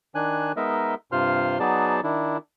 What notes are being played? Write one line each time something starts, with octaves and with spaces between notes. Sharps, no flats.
D#3 D4 G#5 F#6
G#3 B3 D#4 A#4 D#5 E5
G2 C3 F4 C5 C6 F6
F#3 B3 D#4 G#4 D5 A5
D#3 D4 E4